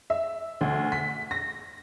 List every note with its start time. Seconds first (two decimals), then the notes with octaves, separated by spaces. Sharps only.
0.10 E5
0.61 D2
0.92 B6
1.31 A#6